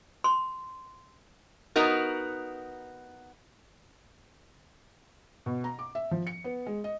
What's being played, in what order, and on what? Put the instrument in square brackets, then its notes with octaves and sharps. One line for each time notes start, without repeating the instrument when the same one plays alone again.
[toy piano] C6
[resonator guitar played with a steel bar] B3 D#4 F#4 A#4
[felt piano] B2
A#5
D6
E5
F3
C#7
B3
G#3
D#5